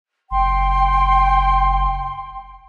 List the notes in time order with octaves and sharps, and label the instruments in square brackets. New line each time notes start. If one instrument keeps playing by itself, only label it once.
[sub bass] F#1 [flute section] G5 [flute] C6